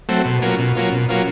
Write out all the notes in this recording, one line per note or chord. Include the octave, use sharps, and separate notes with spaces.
F#3 A3 C4
B2
F#3 A#3 C#4 F4
B2
F#3 A#3 C#4 F4
B2
F#3 A#3 C#4 F4